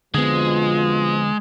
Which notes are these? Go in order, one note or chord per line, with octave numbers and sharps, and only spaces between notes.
F2 B2 D3 F3 G#3 B3